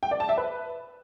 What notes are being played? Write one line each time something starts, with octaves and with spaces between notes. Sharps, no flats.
G5
D5
A5
E5
B4